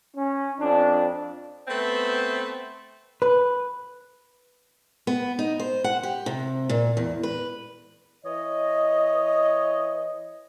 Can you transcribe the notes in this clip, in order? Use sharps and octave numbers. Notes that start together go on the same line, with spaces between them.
C#4
F2 D4
A3 B3 C4 B4 C5 E5
B4
B3
D#4
C5
F#5
G4
C3
A#2
E2
B4
E3 C#5 D#5